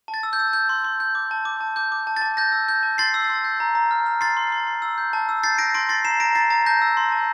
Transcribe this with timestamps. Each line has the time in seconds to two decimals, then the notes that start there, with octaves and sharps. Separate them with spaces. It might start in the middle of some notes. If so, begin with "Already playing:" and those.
0.08 A5
0.14 A6
0.23 E6
0.33 G6
0.39 E6
0.53 G6
0.69 C6
0.84 C6
1.00 G6
1.15 D6
1.31 A5
1.45 D6
1.61 A5
1.76 D6 G6
1.92 D6
2.07 A5
2.16 A6
2.22 A5
2.37 G6 A#6
2.52 E6
2.68 G6
2.83 A5
2.98 C6 A6 C7
3.14 E6
3.30 C6
3.44 G6
3.60 A#5
3.75 A#5
3.91 F6
4.06 F6
4.21 C6 A6 C7
4.37 C6
4.52 C6
4.67 C6
4.82 E6
4.98 G6
5.13 A5
5.29 E6
5.43 G6 A6 C7
5.58 G6 A#6 D7
5.74 C6 A#6 D7
5.89 C6 A6 C7
6.05 A#5 C7 E7
6.20 A#5 A#6 D7
6.35 A#5 A6 C7
6.50 A#5 A6
6.66 A5 G6 A#6
6.82 E6
6.97 C6
7.12 A5